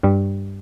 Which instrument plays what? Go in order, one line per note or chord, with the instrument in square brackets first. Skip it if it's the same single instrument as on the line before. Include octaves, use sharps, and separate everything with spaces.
[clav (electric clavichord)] G2 G3